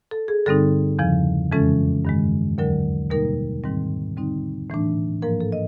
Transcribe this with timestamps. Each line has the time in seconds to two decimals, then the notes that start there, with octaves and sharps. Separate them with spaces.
0.11 A4
0.28 G#4
0.46 G2 D3 G3 C4 D#4 A4
0.99 E2 C#3 F3
1.52 F2 C#3 E3 G#3 C#4 A4
2.05 G2 D#3 G#3
2.58 D#2 D3 F#3 A#4
3.10 B2 G3 A#3 D#4 A#4
3.64 G#2 D#3 G3 C4
4.17 D3 G3 C4 D#4
4.70 A2 E3 A3 D4
5.22 G#2 F3 A#3 A#4
5.41 A4
5.52 D#5